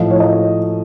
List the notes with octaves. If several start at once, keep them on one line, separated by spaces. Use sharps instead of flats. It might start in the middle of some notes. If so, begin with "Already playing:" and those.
Already playing: A2 F3 D#5
C#5
D#5